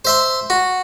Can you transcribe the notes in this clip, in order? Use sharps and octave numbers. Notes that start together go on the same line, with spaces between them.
C5 E5 C6
F#4